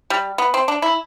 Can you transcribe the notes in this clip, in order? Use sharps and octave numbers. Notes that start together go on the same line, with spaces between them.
G3
B3
C4
D4
E4